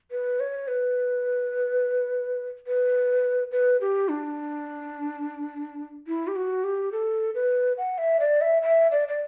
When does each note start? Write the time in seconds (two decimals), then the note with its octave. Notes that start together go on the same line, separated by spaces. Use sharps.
0.11 B4
0.40 C#5
0.68 B4
2.67 B4
3.51 B4
3.81 G4
4.09 D4
6.07 E4
6.27 G4
6.36 F#4
6.64 G4
6.92 A4
7.35 B4
7.78 F#5
7.98 E5
8.20 D5
8.41 E5
8.62 E5
8.91 D5
9.08 D5